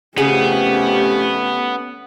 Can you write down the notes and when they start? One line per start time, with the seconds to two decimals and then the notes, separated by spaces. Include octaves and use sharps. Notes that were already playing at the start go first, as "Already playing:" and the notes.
0.18 F2 C#3 A3 B3 C#4 G4 G#4